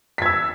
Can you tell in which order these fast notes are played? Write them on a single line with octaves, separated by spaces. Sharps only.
B6 G#6 E6